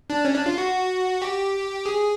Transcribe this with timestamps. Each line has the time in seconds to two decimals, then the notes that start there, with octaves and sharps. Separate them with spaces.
0.10 D4
0.25 C#4
0.35 D4
0.46 F4
0.58 F#4
1.22 G4
1.86 G#4